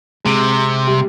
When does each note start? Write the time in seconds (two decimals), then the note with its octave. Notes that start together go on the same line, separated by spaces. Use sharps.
0.25 C3 G#3
0.87 G3